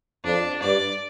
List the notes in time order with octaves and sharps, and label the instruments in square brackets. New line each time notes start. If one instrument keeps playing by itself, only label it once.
[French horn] F2 [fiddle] D4
[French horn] G2 [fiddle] D5